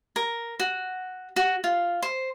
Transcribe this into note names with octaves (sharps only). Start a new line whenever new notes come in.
A#4
F#4
F#4
F4
C5